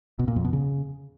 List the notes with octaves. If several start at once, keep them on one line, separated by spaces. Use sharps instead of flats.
B2
A#2
F2
B2
C#3